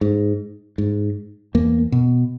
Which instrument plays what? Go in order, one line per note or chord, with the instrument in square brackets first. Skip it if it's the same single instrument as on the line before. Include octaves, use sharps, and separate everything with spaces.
[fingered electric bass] G#2
G#2
E2 A#3
B2